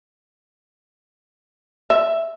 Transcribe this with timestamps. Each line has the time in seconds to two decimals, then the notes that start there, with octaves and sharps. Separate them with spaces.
1.90 E5